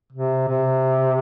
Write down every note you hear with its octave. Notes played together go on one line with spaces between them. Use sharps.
C3
C3